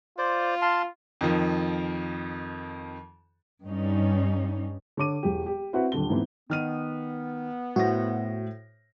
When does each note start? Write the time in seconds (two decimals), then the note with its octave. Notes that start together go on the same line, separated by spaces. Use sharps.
0.18 F4 C5 D5
0.62 F5 A5 C6
1.21 F2 D#3 F3
3.65 G2 G3 C#4 D#4
4.97 D3 C#5 D6 D#7
5.23 E1 G4
5.46 G4
5.73 C4 E4 F#4 B4 F#5
5.92 D#1 D3 G7
6.09 G#2 E3 B3 C4
6.50 D#3 B3 F6 D#7
7.76 A2 F#4 C5 A#6